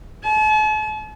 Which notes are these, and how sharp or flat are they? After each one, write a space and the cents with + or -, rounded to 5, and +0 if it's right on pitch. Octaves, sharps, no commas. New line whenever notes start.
A5 -45